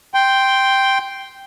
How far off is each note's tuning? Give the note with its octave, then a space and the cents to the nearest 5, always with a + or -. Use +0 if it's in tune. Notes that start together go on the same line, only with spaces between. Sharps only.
G5 +0 C6 +0